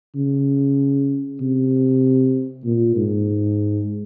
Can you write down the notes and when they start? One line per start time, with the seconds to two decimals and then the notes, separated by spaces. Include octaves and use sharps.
0.15 C#3
1.41 C3
2.65 A#2
2.96 G#2